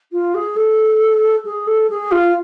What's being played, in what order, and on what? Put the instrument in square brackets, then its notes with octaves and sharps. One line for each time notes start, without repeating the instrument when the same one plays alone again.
[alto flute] F4
G#4
A4
G#4
A4
G#4
F4